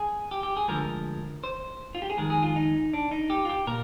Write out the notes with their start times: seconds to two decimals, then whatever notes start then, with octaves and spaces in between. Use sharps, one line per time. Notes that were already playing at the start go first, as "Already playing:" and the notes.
Already playing: G#4
0.31 G4
0.43 G4
0.57 G#4
0.68 D2 D3 F3 G#3 A#4
1.44 C5
1.95 F4
2.02 G4
2.10 G#4
2.18 F2 D#3 G#3 A#4
2.30 G#4
2.42 F4
2.56 D#4
2.93 D4
3.11 D#4
3.30 G4
3.45 F4
3.50 G4
3.67 A#2 A#4